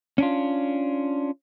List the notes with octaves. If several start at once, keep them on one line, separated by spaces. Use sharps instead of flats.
C#4 D4 F4